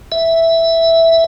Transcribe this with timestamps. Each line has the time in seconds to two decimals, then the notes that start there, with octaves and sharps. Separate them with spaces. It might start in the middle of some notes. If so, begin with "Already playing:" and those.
0.12 E5